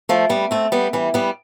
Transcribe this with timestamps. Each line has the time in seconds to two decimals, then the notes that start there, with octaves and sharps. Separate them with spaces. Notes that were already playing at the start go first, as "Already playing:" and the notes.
0.09 F3 A3
0.29 G3 B3
0.51 A3 C4
0.72 G3 B3
0.93 E3 G3
1.14 G3 B3